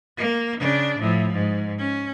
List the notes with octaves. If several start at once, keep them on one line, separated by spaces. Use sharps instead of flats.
A#3
C#3 D4
A2 F3
G#2
C#4